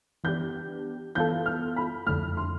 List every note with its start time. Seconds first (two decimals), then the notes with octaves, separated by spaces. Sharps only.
0.24 E3 B3 D4 G4 G6
1.15 E3 B3 F4 A4 G6
1.46 F6
1.76 B5
2.07 F2 D3 A3 F6
2.37 C6